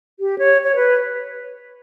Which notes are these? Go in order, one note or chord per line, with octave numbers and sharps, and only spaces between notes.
G4
C#5
C#5
B4